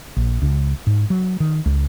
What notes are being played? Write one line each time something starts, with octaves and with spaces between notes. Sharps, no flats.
A#1
C#2
G#2
F#3
D#3
C#2